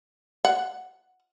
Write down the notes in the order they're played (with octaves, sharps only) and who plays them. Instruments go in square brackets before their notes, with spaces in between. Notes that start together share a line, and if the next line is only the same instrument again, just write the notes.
[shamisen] F#5